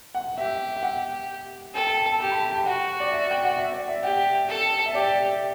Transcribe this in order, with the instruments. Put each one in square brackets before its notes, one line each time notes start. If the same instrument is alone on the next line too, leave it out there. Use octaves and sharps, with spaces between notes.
[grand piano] F#5
[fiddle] G4 [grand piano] E5
[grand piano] E5
F#5
[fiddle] A4 [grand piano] G5
[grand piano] G5
A5
[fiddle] G4 [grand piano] A5
[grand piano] B5
A5
G5
[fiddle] F#4 [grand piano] F#5
[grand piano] D5
E5
G5
F#5
E5
D5
E5
[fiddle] G4 [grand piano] F#5
[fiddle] A4
[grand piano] E5
[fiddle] G4 [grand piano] D5